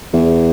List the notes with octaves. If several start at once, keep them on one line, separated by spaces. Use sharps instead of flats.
E2